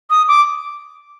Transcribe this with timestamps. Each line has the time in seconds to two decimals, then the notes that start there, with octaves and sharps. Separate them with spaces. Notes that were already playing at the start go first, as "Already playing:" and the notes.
0.10 D#6
0.28 D6